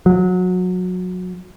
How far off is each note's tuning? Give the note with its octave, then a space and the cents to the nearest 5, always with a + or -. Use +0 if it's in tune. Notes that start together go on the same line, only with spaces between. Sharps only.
F#3 -25